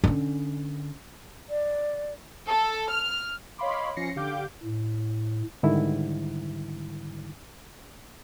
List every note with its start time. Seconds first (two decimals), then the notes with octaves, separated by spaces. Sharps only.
0.04 D3 C#4
1.50 D5
2.47 A4
2.91 F6
3.58 C#5 D#5 F5 B5 C6 D6
3.96 F3 C#4 A#6 C7 C#7
4.16 D3 G4 F5 D6 G6
4.63 A2
5.63 G#2 D3 D#3 G3 E4